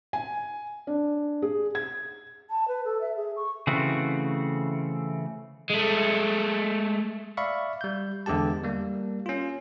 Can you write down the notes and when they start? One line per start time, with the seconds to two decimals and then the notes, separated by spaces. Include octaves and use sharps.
0.13 G#5
0.87 D4
1.42 G#4
1.75 G#6
2.50 A5
2.68 B4
2.85 A4
3.01 E5
3.16 G#4
3.36 C#6
3.67 C#3 E3 A3 C4 F#4
5.70 G#3 A3
7.37 D5 E5 F5 B5 C#6
7.81 G3 G6
8.26 E2 D3 G#3 G4 A5
8.63 G3 A#3
9.26 C#4 F4